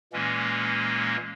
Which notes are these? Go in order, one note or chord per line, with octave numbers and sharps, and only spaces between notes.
A#2 E3 G#3 A#3 C#4